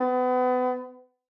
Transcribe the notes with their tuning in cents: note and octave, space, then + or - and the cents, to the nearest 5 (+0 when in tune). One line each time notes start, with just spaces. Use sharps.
B3 +35